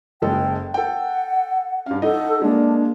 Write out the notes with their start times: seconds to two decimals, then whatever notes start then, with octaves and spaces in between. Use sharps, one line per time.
0.22 F#1 G#3 A4 G5
0.74 A4 F#5 G5
1.86 G2 C#4 F5
2.02 D#4 A4 D#5 F#5
2.42 G#3 A#3 D4